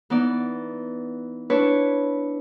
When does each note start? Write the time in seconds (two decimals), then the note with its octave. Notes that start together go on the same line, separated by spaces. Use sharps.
0.10 E3 B3 D#4 D5
1.50 D4 E4 B4 C#5